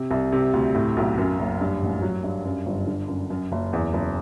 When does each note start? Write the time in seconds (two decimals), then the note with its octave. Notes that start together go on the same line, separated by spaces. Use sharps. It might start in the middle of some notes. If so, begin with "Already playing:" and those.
Already playing: C3
0.11 C2
0.32 C3
0.53 D2
0.75 A2
0.97 B1
1.18 F#2
1.39 F#1
1.61 G2
1.82 A1
2.02 F#3
2.24 G2
2.45 F#2
2.66 G1
2.87 D3
3.08 F#2
3.30 F#2
3.52 F#1
3.73 E2
3.94 F#1